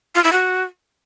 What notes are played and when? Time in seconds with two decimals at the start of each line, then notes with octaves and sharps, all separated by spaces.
0.15 F4
0.24 E4
0.32 F#4